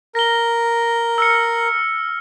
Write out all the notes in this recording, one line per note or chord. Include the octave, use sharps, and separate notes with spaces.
A#4 A#6 G7
E6 F6 C#7